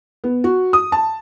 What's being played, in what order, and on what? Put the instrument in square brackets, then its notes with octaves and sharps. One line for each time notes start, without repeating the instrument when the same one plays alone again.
[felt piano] B3
F#4
D#6
A5